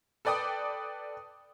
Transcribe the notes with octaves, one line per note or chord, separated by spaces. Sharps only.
A4 B4 D5 G5 D#6